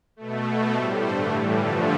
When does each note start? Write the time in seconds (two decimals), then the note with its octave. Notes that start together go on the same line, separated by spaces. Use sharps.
0.16 B2 A3
0.45 B2 A3
0.73 A2 G3 A4 C5
1.02 G2 D3 A3 A4 C5
1.30 A2 E3 G3
1.59 G2 D3 F3 A3 F4 A4